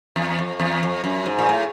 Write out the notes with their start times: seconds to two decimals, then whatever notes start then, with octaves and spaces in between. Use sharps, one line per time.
0.16 E2
0.39 F2
0.60 E2
0.83 F2
1.04 F#2
1.26 G#2
1.39 A#2
1.49 A2